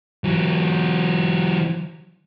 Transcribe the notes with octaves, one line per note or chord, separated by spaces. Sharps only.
E3 F#3